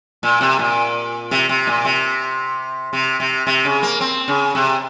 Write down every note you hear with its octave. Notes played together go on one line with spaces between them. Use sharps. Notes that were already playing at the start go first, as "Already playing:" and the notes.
A#2
C3
A#2
C3
C3
A#2
C3
C3
C3
C3
C#3
A#3
C4
C#3
C3